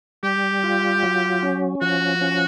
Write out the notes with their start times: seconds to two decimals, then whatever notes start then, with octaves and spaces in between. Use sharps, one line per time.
0.23 G3 G4
0.63 F4
1.03 F#3
1.43 C#4
1.82 F3 F#4
2.21 C#4